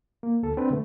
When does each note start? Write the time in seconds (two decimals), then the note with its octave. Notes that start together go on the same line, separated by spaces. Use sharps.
0.23 A#3
0.43 D2 A4
0.57 C4 D4 B4
0.70 D3 A3